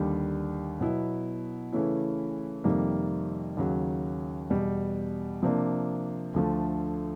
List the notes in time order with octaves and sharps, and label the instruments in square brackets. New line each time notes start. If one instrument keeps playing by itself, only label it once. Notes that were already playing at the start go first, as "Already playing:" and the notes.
Already playing: [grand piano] D#2 D3 G3
B2 F#3 B3 E4
C#3 E3 A3 C#4 E4
F2 C3 D#3 G3 A#3
D#2 C#3 F#3
E2 B2 G3
C3 F3 A#3 D4
D2 D3 F3 A3